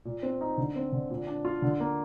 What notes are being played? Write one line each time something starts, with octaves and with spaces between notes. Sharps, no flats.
A#2
C4
D#4
D3
C4
D3
A#2
D4
F4
D3
A#3